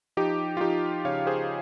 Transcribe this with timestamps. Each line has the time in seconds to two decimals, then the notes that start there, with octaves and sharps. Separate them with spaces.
0.17 F3 D#4 G4
0.57 F4
0.61 F3 D#4 G4
1.05 C#3 C#5 F5
1.27 G#4 C5